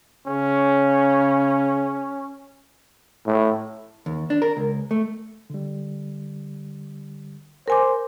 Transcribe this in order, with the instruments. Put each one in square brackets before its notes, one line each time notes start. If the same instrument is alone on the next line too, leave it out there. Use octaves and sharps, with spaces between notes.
[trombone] C#3 [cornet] C#4
[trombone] A2
[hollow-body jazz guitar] D#2
D4
A#4
C#2
A3
[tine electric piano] D3 G3
[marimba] A#4 G#5 D6 [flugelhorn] C5